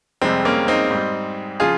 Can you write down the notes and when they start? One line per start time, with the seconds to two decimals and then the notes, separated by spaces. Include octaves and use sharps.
0.22 F2 C3 G3 G#3 C4
0.45 A#3 C#4
0.68 C4 D#4
0.91 G#2 G3
1.60 C#3 F3 F4 G#4